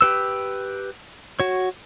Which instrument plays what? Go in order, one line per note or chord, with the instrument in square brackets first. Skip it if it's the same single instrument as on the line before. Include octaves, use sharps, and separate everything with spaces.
[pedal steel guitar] G4 B4 E6
F#4 C#5